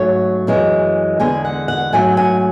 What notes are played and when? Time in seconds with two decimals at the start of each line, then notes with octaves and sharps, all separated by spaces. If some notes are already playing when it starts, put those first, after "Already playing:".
Already playing: G#2 F#3 A3 C#5
0.47 F#2 E3 G#3
1.20 E2 D3 G#3 G#5
1.45 F#5
1.68 F#5
1.93 G#2 F#3 A3 G#5
2.17 G#5